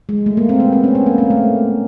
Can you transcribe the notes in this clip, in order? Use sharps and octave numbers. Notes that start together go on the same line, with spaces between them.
G#3
A3
A#3
C4
B3
C4
C#4
B3
A#3
A#3
A3